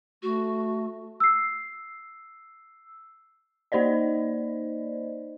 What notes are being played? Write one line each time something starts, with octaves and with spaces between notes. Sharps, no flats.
A3 F#4
E6 C7
A#3 D#4 C5 D5 D#5